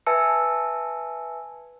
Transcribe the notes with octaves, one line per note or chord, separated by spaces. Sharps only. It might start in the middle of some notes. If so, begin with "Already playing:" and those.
B4 E5 G#5 A5 E6 C#7